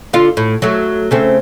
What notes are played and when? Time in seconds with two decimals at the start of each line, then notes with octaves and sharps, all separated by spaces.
0.13 D3 F4
0.37 A2
0.62 F#3 A3
1.11 C#3 A3 C4